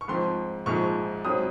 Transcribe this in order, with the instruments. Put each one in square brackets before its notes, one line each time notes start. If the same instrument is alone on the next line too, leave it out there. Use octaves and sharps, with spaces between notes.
[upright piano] C#6
G#2 F3 C4 C6
A#1 G#2 F3 G#3 C#6
G#2 F#3 C4 D#6